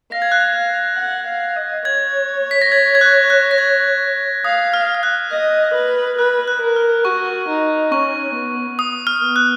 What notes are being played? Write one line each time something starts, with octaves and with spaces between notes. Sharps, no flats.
F5 A#6
G#6
F#6
G#6
F5
F#5
F5
D#5
C#5 G#6
B6
A#6
G#6
G#6
F#6
F#6
A#6
G#6
F5 D#6
F6
F6
F#6
D#5
B4
B4 F#6
F#6
A#4
F6
F#4 C#6
D#4
C#4 C#6
B3
D#6
F6
B3
F#6